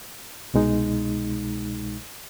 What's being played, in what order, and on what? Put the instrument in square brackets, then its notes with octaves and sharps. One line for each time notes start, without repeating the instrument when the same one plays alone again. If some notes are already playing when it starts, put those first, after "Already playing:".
[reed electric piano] C2 B2 G#3 D#4